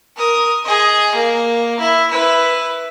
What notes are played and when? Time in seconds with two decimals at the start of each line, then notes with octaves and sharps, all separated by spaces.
0.16 A#4 D#6
0.65 G#4 D#5
1.15 A#3
1.80 E4
2.11 E4 B4